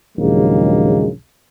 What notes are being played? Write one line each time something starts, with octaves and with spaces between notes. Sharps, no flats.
A#1 D#2 C#3 F#3 G#3 A#3